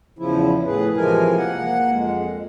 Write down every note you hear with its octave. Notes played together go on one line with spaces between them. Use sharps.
E2 C#3 F3 E4
A2 G#4 B4
C3 E3 F3 G#3 A#4 G#5
A#3 F#5
F2 G#3